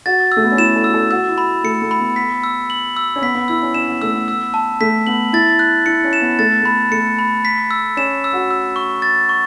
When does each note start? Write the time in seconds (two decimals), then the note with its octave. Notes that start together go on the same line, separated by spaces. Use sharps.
0.06 F#4 A6
0.32 E6
0.37 A3
0.44 B3
0.52 C#4
0.58 E4 E7
0.76 A4
0.84 F#4 E6
0.94 A4
1.11 F#4 E6
1.28 E4
1.38 B5
1.64 A3 C#7
1.82 A3
1.91 B5
2.00 B3
2.16 B6
2.44 E6
2.70 F#7
2.97 E6
3.16 C#4
3.22 B3 B6
3.35 B3
3.48 E4 E6
3.62 C#4
3.74 C#4 E7
3.88 B3
4.02 A3 E6
4.14 B3
4.28 E6
4.54 A5
4.81 A3 B6
5.07 B3 F#7
5.33 E4 A6
5.59 F#6
5.86 E4 C#7
6.04 C#4
6.13 E7
6.21 B3
6.39 A3 A6
6.50 B3
6.62 A3 B5
6.91 A3 C#7
7.19 B5
7.45 B6
7.71 E6
7.97 C#4 E7
8.24 E6
8.33 F#4
8.51 E6
8.76 C#6
9.02 A6
9.29 C#6